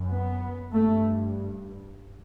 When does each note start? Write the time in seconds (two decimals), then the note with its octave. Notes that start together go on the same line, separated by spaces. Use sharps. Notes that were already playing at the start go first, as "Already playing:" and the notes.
Already playing: F#2
0.09 B3
0.72 G2 A3